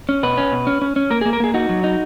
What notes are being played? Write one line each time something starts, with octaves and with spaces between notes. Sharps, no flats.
C#4
B2 B4
C#4
B2
C#4
C#4
C#4
A#3 A#4
G#4
A#3
A#4
A#3 G#4
D#4 F#4
F#3
D#4